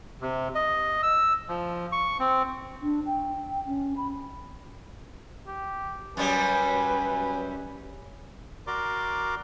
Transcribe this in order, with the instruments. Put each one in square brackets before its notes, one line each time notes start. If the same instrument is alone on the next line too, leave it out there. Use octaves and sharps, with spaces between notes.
[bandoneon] C3
D#5
E6
F3
C#6
C4
[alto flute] D4
G5
C#4
B5
[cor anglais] G4
[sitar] F#2 F#3 G3 [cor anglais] B4 [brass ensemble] G#5
[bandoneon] F#4 A#4 D5 A#5 C6 D6